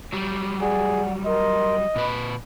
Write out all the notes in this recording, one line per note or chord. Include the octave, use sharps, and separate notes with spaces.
F#3 G3
G#4 D5 F#5
A#4 D#5 C6
A#2 B4 B5